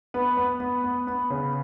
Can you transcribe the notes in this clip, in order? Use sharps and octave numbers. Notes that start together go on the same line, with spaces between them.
B3 B4
B3
B3
B3
B3
C#3